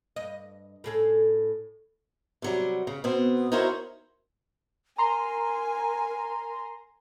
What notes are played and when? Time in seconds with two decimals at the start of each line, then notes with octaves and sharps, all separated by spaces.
0.16 G2 D#5
0.84 A2 G#4 A4
2.42 C3 F#3 G3
2.87 C#3
3.04 B2 B3 C4
3.52 D#4 E4 F#4 A#4 C5 C#5
4.98 A#4 G#5 A#5 C6